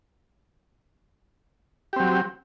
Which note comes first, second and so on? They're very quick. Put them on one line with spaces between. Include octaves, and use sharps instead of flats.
G4 C4 F#3